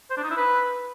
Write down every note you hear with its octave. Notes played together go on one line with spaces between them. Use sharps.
C5
D4
D#4
E4
B4